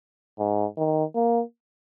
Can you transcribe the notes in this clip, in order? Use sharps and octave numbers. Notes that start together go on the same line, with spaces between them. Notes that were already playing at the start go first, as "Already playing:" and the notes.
G#2
D#3
A#3